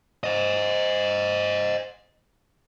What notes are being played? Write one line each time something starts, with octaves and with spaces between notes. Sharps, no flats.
C5 D#5